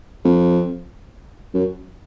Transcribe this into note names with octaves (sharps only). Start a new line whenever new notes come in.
F2
F#2